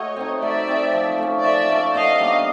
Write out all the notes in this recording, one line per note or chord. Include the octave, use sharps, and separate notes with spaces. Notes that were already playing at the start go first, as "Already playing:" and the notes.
Already playing: A3 F#4 C#5 D#5
C4 D#4
A3 D5 E5
C4 D#4
F3
A3 C#4
F3 D5 E5
A3 C#4
B2 D#5 F5
G3 A#3 D4